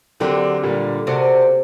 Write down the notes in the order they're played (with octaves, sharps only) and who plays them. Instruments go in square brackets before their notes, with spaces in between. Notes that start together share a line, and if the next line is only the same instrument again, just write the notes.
[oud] D3 [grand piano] F#3 C4 G4 A#4
[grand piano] A#2 G3 A#3
[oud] C3 [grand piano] A#3 F#4 A4 D5